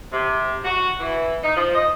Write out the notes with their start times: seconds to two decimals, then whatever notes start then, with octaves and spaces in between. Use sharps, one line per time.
0.13 C3
0.65 F#4
1.00 E3
1.43 D#4
1.57 F3
1.75 D#5